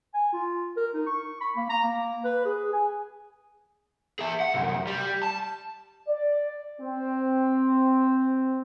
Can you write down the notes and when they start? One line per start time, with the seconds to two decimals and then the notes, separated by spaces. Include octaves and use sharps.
0.14 G#5
0.33 F4
0.77 A#4
0.94 D#4
1.07 C#6
1.41 B5
1.57 A#3
1.70 A#5
1.83 A#3
2.25 B4
2.45 G#4
2.73 G#5
4.19 G#4 E5
4.40 F#5
4.54 C2 F#2
4.87 G3
5.23 A5
6.08 D5
6.81 C4